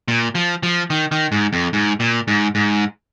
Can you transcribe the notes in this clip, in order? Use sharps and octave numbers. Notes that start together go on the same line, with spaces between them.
A#2
F3
F3
D#3
D#3
G#2
F2
G#2
A#2
G#2
G#2